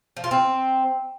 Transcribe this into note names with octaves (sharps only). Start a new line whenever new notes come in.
F3
F4
C4